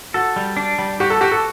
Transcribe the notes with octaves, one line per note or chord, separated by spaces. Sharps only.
F#4 A4
G3
D4
G3
F#4 G4
A4
F#4 G4
A4